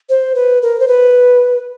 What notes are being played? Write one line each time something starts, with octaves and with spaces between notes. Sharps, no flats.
C5
B4
A#4
C5
B4